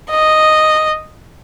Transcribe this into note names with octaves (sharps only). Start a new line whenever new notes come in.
D#5